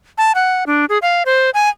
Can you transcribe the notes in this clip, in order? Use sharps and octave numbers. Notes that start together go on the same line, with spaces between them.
A5
F#5
D4
G#4
F5
C5
G#5